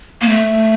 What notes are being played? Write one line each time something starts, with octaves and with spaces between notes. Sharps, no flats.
A#3
A3